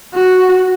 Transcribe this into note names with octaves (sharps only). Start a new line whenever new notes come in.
F#4